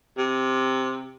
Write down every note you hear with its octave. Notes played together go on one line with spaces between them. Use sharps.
C3